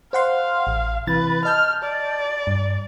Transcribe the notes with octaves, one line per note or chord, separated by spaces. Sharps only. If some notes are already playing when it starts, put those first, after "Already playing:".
C5 F5 F#5 C6
A1
C3 E3 B4 A6
D#5 A5 F6 G6
D5
G2